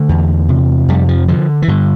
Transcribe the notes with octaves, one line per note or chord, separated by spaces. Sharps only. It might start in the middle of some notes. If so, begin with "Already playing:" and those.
Already playing: D3 A3
E2
C3
F2 G3
F3
D3 F3
E3
G2 D3